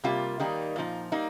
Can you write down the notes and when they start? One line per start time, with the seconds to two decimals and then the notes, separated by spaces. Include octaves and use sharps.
0.04 C3 G3 A#3 F4
0.40 D#3 G3 A#3 D#4
0.76 A#2 F3 D#4
1.12 G3 A#3 D#4